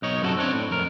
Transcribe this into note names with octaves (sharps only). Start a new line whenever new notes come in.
B1 D#4 C#5
F#2 C3 E4 F#4 A4
C4 D4 C#5
A2
F2 A#4